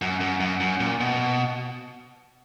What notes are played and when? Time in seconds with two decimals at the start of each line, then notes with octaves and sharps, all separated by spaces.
0.02 F#2
0.21 F#2
0.40 F#2
0.60 F#2
0.80 A#2
1.00 B2